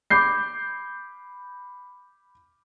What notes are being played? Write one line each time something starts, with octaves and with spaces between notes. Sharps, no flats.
B5 D6 G6 C7